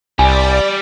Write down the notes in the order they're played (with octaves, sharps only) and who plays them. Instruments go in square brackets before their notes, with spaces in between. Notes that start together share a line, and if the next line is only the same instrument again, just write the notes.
[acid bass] C2 [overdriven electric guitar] G3 [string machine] D5 [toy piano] G#5